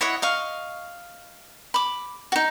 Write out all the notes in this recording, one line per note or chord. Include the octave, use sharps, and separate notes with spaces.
E4 C#5 D#5 F#5
D#5 F5 C#6
B5 D6
D#4 F#4